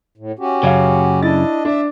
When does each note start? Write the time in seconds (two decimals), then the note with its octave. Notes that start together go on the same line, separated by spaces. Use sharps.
0.18 A2
0.39 C#4 F#4 G4
0.63 F#2 C#3 C#5 F5
1.22 D4 E4 D#5 A6
1.65 D4 E5